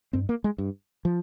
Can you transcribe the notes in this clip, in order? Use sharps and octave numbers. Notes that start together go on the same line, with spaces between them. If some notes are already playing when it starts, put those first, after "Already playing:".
G2 C4
A#3
G#3
G2
F3